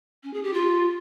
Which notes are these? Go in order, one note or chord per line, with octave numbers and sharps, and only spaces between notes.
C#4
G#4
G4
F4